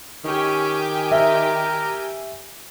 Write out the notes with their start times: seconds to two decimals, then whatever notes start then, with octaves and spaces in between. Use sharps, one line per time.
0.25 D#3 C#4 G4 G5 G#5
1.11 A#4 E5